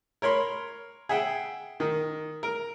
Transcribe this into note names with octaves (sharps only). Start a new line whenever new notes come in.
A#4 C#5 B5 C6
G#4 E5 F#5 G5
D#3
A#4